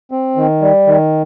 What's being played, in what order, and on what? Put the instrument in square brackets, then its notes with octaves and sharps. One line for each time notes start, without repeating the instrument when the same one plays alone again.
[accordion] C4
D#3
G3
D#3